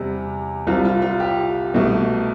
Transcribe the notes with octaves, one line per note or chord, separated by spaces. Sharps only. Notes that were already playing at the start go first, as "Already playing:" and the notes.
Already playing: E2 C3 G3
C2 C3 G3 F4
F4
F4
G4
C2 B2 A3